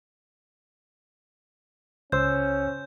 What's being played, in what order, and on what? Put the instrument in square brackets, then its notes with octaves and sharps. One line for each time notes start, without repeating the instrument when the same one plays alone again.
[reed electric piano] C#2 C5 E6 [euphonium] C#4 [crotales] G6